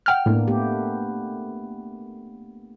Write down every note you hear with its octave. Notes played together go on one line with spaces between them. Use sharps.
F#5 G5 F6
A2 A#3 B3 D4
A3 B3 G4